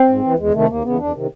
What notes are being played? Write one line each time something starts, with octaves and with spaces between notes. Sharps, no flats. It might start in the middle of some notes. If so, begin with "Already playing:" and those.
Already playing: C4
G#2
E3
E2 G#3
C3 D#3 A3
D#2 A#3
C#3 E3 B3
E2 D4
C3 D#3